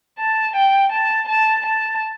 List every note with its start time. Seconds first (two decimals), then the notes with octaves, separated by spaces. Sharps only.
0.19 A5
0.56 G5
0.92 A5
1.29 A5
1.66 A5